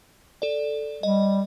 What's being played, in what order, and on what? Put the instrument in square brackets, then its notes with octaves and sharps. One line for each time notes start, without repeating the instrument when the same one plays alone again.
[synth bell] A4 D5
[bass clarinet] G3 [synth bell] D#5